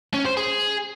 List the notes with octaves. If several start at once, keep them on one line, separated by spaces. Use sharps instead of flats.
C#4
C5
G#4